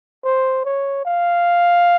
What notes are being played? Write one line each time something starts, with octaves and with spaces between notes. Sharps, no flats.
C5
C#5
F5